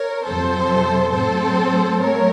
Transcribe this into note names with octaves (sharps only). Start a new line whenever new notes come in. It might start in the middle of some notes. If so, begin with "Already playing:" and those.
Already playing: A#4 C#5
F2 C3 F#3 C4 A4 C5
A2 F#3 C4 A4 C5
F#3 A3 C4 A#4 C#5